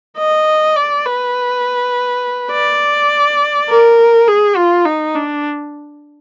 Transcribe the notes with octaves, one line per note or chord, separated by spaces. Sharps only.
D#5
D5
B4
D5
A#4
G#4
F4
D#4
D4